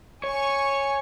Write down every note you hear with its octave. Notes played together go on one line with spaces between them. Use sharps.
C#5 G#5 C#6